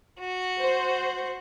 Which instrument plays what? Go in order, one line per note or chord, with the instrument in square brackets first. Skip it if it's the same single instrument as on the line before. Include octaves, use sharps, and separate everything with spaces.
[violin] F#4
[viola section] C5